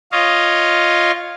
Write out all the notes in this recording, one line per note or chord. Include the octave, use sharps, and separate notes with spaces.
F4 C#5 D#5 F5